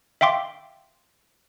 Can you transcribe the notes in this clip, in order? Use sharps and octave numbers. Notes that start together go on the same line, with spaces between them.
E5 F5 G5 C6 D6